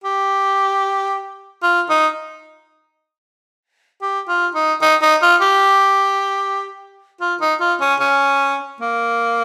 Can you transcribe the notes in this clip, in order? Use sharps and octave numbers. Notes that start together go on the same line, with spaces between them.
G4
F4
D#4
G4
F4
D#4
D#4
D#4
F4
G4
F4
D#4
F4
C#4
C#4
A#3